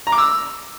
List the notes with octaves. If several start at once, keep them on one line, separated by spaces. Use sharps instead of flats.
A#5
D6
E6